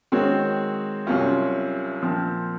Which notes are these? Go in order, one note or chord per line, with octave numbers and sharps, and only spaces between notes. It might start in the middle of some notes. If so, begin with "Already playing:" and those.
D#3 G#3 C4 F#4 C#5
C2 C3 F#3 C#4 F4
A#2 F3 C4